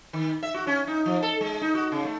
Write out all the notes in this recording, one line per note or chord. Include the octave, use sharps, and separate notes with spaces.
D#3
E5
F#4
C#4
D#4
F3
A4
G#3
D#4
F#4
C#3
A3